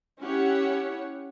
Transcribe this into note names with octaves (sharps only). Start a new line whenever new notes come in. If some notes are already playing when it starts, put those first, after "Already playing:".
C#4 E4 G4 C#5 F#5